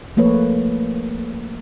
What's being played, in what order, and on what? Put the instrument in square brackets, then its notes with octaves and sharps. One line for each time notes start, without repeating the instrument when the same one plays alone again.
[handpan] F3 A3 A#3 B4 C#5